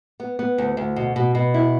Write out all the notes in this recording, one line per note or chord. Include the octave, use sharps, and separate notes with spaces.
B3
B3
D2
D2
B2
B2
B2
E4